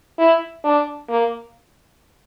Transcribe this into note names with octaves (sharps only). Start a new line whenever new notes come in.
E4
D4
A#3